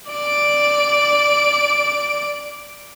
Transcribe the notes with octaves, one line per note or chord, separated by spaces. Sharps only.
D5 D7